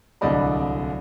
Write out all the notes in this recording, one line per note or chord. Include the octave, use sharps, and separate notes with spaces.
D1 C2 D3 D5 D#5 B5